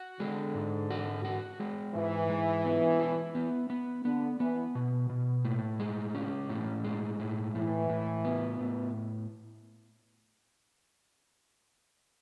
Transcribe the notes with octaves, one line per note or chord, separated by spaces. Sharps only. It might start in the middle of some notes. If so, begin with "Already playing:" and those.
Already playing: F#4
D3 G#3
G#2
F#4
F#4
G#3
G#2 E3
G#3
B3
E4
B3
B3
D3 B3
E3 B3
B2
B2
A2
G#3
C#4
A2
G#3
A2
A2 E3
A2
B3
A2